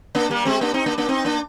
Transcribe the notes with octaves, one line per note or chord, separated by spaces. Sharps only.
A#3 D4
G3 A#3
G#3 C4
A#3 D4
C4 D#4
A#3 D4
A#3 D4
C4 D#4
A#3 D4